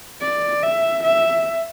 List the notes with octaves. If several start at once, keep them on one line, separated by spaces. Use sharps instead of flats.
D5
E5
E5